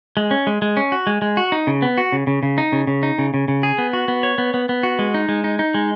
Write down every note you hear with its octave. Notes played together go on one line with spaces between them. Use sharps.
G#3
C#4
G#3
G#3
C#4
F#4
G#3
G#3
F#4
D#4
C#3
B3
F#4
C#3
C#3
C#3
D#4
C#3
C#3
D#4
C#3
C#3
C#3
G#4
B3
F#4
B3
C#5
B3
B3
B3
F#4
G#3
D#4
G#3
D#4
D#4
G#3